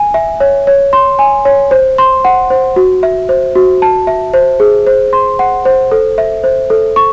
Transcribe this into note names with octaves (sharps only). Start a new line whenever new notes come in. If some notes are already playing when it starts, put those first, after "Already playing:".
Already playing: G#5
E5
C#5
C#5
C6
G#5
C#5
C5
C6
F#5
C5
F#4
E5
C5
F#4
A5
E5
C5
G#4
C5
C6
F#5
C5
A4
E5
C5
A4
C#6